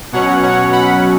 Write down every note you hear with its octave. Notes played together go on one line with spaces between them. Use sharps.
B2 F#3 C#4 C#5 F#5
C#5 F#5
F#5 B5